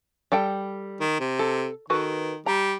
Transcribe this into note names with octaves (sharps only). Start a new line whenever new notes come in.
G3 A4 G5
D#3
C3
A4
D#3 F#4 A4 B4
G3 A#5